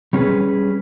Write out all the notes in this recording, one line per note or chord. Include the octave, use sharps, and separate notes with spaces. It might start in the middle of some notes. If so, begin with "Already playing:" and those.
G3 C#4 G#4 B4